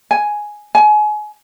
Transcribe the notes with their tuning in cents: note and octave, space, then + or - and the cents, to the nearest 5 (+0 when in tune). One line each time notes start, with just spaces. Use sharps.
G#5 +5
G#5 +30